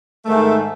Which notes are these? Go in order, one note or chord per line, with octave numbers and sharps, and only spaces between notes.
G#2 D#3 A3